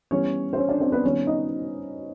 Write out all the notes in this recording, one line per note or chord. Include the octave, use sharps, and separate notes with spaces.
E3 G3 B3 C#4 C#5
C5
C#4 C#5
D4 D5
C4 C5
B3 B4
D#3 G3 B3 C#4 C#5
D#4 D#5